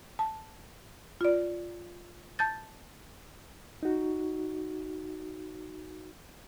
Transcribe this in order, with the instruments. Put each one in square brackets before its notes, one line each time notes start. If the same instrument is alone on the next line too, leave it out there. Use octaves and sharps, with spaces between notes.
[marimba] A5
F4 D5
A5 G6 A6
[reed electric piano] D#4 F#4